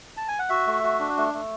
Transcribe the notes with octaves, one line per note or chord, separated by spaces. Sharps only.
A5
G#5
F#5
F#4 E5
A3
F#4
D4
A3
A3